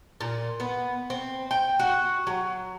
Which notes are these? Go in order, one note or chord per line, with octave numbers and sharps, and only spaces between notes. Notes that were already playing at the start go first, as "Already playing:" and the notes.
A#2
B3
C4
G5
F#4
F#3